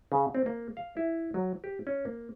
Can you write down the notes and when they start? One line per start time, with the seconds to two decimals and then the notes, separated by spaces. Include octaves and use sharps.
0.12 C#3
0.35 C4
0.46 A#3
0.77 F5
0.97 E4
1.34 F#3
1.64 G4
1.87 C#4
2.05 A#3